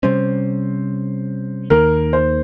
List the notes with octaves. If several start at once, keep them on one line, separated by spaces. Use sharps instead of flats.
C3 G3 C#4 C5
D#2 D#3 A#3 A#4
C5